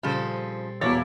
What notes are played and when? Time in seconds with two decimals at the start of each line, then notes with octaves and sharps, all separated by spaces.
0.03 A#2 C#3 F3 G3 C4 G4 A4 C5
0.81 E2 B2 E3 A#3 E4 C#5 A6